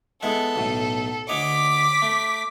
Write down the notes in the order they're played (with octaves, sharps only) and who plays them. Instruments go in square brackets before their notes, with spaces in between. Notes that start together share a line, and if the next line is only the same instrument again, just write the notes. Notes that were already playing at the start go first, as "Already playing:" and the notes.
[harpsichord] G#3 B3 E4 [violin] A4
[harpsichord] B1 A2
[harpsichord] D2 C#5 D#5 [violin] D6 B6
[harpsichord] A3